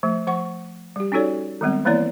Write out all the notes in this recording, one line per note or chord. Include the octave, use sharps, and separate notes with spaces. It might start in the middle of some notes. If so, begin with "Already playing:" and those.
F3 A3
F3 F#5 C#6
G3 G4
C#4 D#4 F#4 A4 C#5 D5
D#3 G3 G#3 B3 C4
E3 A#3 B3 E4 C#5 D5